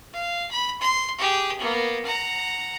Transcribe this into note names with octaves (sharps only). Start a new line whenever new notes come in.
F5
B5
C6
G4 G#4
A#3 B3
F#5 A#5